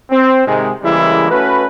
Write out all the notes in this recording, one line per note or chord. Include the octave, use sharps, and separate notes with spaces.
C4
G#2 C3 D#3 G#3
C#3 E3 G3 G#3 A#3 E4
A3 C#4 F#4 B4